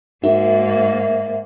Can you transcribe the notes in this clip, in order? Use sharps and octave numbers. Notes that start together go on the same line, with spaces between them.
G#2 A#3 D#4 F#4 A#4 E5